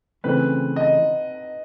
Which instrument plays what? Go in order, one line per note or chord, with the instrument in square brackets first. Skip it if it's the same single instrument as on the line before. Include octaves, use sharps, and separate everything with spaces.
[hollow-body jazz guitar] C#3 E3 A3 C4 [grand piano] B4
[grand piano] D#5